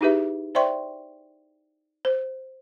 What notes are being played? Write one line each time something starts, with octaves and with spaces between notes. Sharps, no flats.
D#4 E4 G4 G#4 B4 E5
C5 D5 E5 G5 C6 C#6
C5